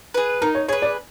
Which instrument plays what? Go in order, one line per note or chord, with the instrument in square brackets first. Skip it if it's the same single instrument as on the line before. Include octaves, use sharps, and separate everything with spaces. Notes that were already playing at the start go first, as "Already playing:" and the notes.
[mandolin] G#4 B4
[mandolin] D#4 [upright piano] A#4
[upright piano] C#5
[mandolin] G#4 B4 [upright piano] C#5
[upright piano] D5